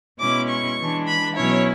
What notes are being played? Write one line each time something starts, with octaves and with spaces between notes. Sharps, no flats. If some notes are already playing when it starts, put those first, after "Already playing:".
B2 G#3 C#4 E4 D6
C#6
E3 G#3 D4
B5
B2 F#3 C#4 E4 C#5